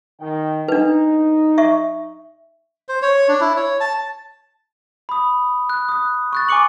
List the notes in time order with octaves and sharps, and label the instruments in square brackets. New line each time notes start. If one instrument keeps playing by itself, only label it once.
[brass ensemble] D#3 G5
[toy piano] D4 B4 [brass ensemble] D#4
[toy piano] E5 C#6
[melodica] C5
C#5
D4
E4
C#5
A5
[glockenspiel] B5 D#6
F#6
D#6 F#6
C#6 F#6 A6
G#5 C#6 D6 C#7 F#7